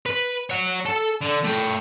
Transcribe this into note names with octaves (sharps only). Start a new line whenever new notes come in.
B4
C#5 F#5
A4
D3
A3 G5